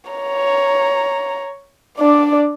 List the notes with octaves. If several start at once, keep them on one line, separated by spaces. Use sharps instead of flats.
C#5 A#5
D4 D5